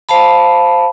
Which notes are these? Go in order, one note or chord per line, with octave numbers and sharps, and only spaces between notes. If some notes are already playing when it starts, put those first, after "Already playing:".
C5 F5 A5 B5